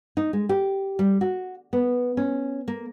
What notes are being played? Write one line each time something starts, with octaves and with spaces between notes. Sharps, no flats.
D#4
G#3
G4
G3
F#4
B3
C#4
A#3